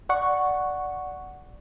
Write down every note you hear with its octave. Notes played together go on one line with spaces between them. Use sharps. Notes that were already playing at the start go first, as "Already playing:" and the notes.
D5 F#5 C#6